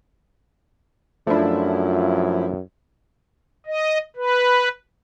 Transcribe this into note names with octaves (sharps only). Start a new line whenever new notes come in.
F#2 F3 A3 D4 E4
D#5
B4